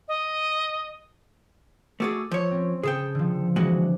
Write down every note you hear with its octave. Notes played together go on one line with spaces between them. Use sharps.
D#5
A3 F#4 G#4 D6 E6 A6
F3 C#5
C4 C#4
C#3 G#4 A4 G5
D3 F3
C3 E3 G#3 D4 F#4